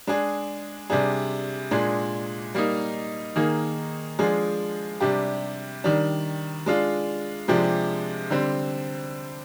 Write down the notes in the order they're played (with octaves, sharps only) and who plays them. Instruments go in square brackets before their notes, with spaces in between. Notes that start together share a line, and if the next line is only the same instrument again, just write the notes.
[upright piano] G#3 D4 G#4
C3 G3 D4 G#4
A#2 G#3 D4 G#4
G3 A#3 D#4
D#3 A#3 D#4 G#4
F3 G#3 D4 F4 G#4
C3 G3 D4 G4
D#3 G3 D4
G#3 D4 F4
C3 F3 G#3 D4 G4
D3 G3 C4